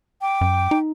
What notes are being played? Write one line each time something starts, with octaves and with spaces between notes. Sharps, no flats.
G5 D6
F#2
D#4